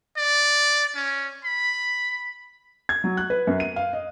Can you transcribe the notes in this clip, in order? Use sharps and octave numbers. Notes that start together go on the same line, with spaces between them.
D5
C#4
B5
G#6
F#3
F#6
B4
F#2
D#7
F5
D#5